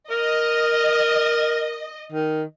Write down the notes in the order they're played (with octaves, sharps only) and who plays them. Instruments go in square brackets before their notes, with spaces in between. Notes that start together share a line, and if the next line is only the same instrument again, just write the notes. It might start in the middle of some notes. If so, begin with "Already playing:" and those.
[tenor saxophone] A#4 [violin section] D#5
[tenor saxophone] D#3